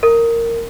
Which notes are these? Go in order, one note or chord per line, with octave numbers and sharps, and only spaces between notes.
A#4